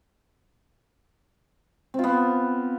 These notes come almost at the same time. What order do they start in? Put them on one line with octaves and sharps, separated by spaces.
C4 F4 B3